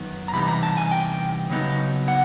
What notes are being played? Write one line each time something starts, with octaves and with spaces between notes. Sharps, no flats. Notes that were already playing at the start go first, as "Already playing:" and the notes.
Already playing: F#2 D#3 B3
A#5
C3 E3 G3 B3 D#4 B5
A#5
A5
G#5
G5
C#3 F#3 B3 D#4
F#5